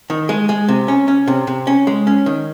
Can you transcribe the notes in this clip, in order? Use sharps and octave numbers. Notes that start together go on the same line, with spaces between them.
D#3
G#3
G#3
C3
C#4
C#4
C3
C3
C#4
G#3
C#4
D#3